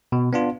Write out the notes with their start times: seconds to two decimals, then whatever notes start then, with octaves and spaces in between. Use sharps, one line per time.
0.12 B2
0.33 B3 D4 F4